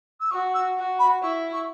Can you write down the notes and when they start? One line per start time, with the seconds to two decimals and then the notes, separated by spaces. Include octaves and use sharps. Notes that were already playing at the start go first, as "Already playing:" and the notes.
0.21 E6
0.31 F#4 C#6
0.54 E6
0.77 F#4
0.99 B5
1.22 E4 C#6
1.53 C#6